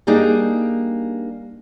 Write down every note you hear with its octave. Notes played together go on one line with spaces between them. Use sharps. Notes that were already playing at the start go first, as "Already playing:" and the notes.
G3 A#3 D4 D#4 G4 G#4